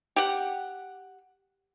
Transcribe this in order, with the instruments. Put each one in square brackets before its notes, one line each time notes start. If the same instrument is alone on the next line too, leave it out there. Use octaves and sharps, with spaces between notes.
[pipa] G4 F#5